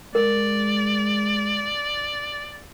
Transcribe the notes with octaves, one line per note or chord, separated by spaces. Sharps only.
G#3 A#4 D5